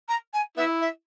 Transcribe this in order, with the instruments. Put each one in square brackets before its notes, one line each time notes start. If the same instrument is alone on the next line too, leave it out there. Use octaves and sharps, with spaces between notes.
[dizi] A#5
G#5
[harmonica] B3 E4 [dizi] E5
[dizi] E5